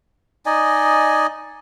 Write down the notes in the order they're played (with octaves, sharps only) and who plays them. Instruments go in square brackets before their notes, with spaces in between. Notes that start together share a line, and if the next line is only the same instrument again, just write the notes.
[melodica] D#4 D5 D#5 G#5